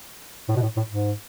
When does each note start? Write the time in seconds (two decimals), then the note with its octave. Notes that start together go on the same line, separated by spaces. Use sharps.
0.49 A2
0.56 B2
0.62 A2
0.77 A2
0.91 G#2